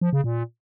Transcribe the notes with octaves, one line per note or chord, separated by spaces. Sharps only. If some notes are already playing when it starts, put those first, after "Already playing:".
F3
C#3
A#2